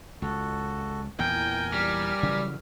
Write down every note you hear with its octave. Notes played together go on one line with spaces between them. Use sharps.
C#2 F#4 A4
E2 A#2 E3 A#4 G5 G#5
G3 F6
C#3 E3 F#3